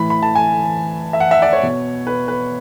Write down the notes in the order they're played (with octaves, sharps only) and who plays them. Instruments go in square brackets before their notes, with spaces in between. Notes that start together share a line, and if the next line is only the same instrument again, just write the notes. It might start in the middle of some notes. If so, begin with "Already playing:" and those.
Already playing: [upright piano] A2 E3 B5
B5
A5
G#5
E5
F#5
E5
D5
C#5
B2
B4
B4